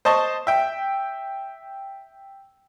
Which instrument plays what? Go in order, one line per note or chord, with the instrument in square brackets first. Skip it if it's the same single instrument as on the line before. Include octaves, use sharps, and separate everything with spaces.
[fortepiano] C5 D#5 A5 C#6
E5 G5